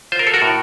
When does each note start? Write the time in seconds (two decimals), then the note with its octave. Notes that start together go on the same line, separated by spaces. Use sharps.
0.12 F4 C5
0.19 A#4
0.27 A4
0.34 F#4 A#4
0.42 A2